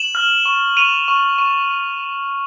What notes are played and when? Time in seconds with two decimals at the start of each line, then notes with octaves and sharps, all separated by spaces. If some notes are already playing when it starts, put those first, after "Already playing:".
Already playing: E7 F#7
0.15 F6
0.46 C#6
0.77 C#6 D#7 F7
1.08 C#6
1.38 C#6